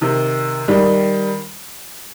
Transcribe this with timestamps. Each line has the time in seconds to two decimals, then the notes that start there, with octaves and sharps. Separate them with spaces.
0.01 C3 D#3
0.68 D#3 G3